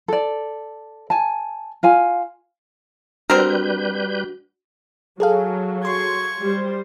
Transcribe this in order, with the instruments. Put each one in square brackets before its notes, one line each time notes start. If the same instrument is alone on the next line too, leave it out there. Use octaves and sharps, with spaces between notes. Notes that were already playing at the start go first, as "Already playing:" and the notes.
[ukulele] A4 D5
G#5 A5
F4 F5 G#5
[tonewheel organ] G3 B4 G6 [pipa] C4 A#4 [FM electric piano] D4 F#4
[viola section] F#3 [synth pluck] G#4 A4 F5
[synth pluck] C6 [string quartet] C#6 G#6
[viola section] G3 C5